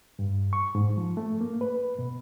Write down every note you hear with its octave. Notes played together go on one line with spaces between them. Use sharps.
G2
C#6
G#2
F3
A3
A#3
B4
B2